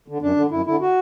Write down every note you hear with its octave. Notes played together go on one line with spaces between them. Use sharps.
D3
F#2 D4
D3
F#2 E4
D3 E4
F#4